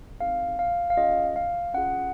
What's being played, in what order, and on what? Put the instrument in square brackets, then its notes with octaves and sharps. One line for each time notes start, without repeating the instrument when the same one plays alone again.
[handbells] C4 D#4 G#4 F5
F5
F5
C#4 F4 G#4 D#5
F5
C#4 F4 G#4 F#5